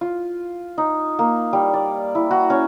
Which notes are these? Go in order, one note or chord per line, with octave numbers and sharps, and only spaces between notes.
F4
D#4
A#3
G3
D5
E4
F#4
C#4